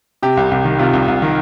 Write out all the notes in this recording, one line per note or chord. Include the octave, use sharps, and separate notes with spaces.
C3 G4
C2
C2 G4
D#3
C3 F4
C2
C2
D#3